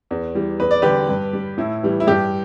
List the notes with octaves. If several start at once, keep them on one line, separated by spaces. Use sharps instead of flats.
E2
E3 G3
E2 B4
D5
D3 G3 G4 B4
G2
G3
A2 E4
E3 G3
E4
G2 G4